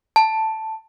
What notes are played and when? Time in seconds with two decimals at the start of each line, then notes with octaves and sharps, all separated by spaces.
0.16 A5